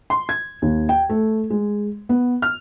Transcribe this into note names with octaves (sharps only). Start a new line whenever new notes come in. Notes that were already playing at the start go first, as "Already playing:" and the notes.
C6
G#6
D#2
G5
A3
G#3
B3
F6